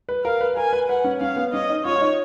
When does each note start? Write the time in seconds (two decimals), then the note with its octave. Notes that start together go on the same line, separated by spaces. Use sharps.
0.09 B4
0.24 A#4 F5
0.41 B4
0.56 A#4 G#5
0.73 B4
0.89 B4 F#5
1.04 C#4
1.21 C#4 F5
1.36 B3
1.53 C#4 D#5
1.69 D#4
1.85 F4 C#5
1.95 F4
2.01 D#4